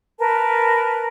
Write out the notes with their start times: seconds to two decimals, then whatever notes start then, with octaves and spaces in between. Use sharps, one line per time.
0.20 A#4 B4 A5